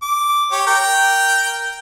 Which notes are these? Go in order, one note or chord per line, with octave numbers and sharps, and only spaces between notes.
D6
G4 C#5
A#4 G5